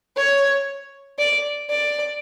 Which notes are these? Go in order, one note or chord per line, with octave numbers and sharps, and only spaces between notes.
C#5
D5
D5